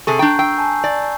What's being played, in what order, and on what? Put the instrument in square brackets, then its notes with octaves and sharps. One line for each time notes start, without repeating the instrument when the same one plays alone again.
[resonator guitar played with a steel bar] C3 G#4 A4 [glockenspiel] C#6
[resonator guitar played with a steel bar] D4 G5 [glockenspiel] A#5 C#6 G6
[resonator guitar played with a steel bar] G5 [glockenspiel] E6 C7
[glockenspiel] G#5 A5
[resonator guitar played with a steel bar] D5